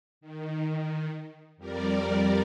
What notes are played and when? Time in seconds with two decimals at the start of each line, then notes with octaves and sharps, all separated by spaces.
0.21 D#3
1.57 F2 G3 A#4 D5